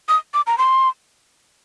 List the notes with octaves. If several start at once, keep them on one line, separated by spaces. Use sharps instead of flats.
D#6
D6
A#5
C6